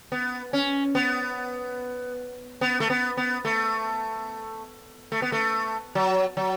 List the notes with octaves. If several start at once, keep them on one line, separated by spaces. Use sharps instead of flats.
B3
C#4
B3
B3
A3
B3
B3
A3
A3
B3
A3
F#3
F#3